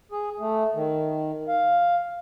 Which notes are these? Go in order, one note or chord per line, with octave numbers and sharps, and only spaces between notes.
G#4
A3
D#3
F5